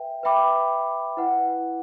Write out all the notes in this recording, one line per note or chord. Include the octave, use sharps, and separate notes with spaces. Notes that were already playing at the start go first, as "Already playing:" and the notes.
Already playing: B4 E5 G5
B4 E5 G5 B5 D6
E4 B4 F#5